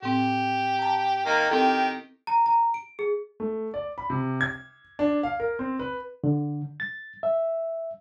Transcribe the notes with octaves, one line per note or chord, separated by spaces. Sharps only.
A2 C4 G4
A5 A#5
D#3 A#3 D#4
D#3 C4 E4 G4 A4
A#5
A#5
D7
G#4
A3
D5
B5
C3
G#6
D4
F5
A#4
C4
B4
D3
A6
E5